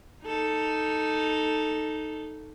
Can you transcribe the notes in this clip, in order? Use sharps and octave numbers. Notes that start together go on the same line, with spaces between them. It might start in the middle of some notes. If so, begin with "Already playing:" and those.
D#4 A4